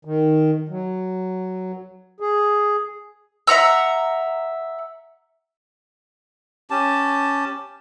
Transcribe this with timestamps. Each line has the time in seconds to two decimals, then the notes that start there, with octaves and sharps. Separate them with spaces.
0.05 D#3
0.69 F#3
2.20 G#4
3.47 E5 F#5 A#5 E6
6.70 C#4 G4 A5